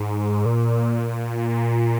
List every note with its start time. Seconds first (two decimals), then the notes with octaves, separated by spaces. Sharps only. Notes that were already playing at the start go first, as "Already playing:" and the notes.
Already playing: G#2
0.46 A#2